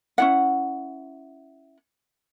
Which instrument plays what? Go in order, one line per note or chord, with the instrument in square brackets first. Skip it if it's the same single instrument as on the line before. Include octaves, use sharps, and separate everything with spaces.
[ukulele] C#4 E4 F#5